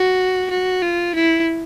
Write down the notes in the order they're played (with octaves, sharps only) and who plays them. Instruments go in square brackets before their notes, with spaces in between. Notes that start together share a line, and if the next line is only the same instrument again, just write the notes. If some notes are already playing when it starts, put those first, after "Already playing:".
Already playing: [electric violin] F#4
F#4
F4
E4